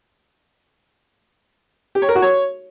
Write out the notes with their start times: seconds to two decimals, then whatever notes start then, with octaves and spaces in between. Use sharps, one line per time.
1.95 G4
2.02 C#5
2.09 A#4
2.15 F#4
2.22 C#5